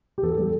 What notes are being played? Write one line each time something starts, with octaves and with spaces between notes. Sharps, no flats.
G4
E2 A4
G3 A4